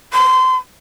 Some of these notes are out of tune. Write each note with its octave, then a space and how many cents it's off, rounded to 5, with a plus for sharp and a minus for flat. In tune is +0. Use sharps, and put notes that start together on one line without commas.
C6 -25